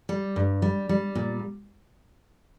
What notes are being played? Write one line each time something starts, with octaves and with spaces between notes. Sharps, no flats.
G3
G2
G3
G3
A#2